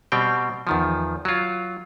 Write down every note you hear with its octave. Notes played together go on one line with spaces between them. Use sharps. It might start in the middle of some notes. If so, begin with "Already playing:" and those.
B2 G3 C4 G5
E2 D#3 F3
F#3 F4